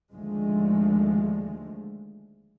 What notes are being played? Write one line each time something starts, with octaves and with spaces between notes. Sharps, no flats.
D#2 D3 F3 G#3 A3